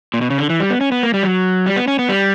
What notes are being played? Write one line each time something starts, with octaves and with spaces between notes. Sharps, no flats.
A#2
B2
C#3
D3
E3
G3
B3
C#4
B3
A#3
G3
F#3
G3
B3
C#4
B3
G3